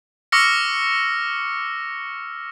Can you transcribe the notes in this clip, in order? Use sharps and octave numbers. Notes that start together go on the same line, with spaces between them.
C#6 D6 E6 F6 A#6 C#7